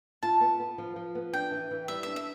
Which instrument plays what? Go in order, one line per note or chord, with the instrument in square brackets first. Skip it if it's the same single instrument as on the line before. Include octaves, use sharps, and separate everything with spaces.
[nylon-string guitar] F4 [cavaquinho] A5
[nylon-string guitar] B3
B3
F3
F3
B3
[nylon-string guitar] D4 [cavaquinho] G5
[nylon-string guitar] E3
E3
[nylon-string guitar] G3 [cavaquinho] E5
[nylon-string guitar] D4 [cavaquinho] E5
[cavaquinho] E5